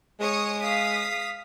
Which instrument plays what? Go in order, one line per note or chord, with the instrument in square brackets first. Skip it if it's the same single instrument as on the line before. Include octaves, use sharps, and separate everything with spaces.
[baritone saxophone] G#3 [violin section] C#5 C#6 D#6
[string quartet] F5 [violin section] D#6 B6